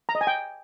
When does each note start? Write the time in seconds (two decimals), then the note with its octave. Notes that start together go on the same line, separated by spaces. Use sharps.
0.09 A#5
0.15 D#5
0.21 G#5
0.27 G5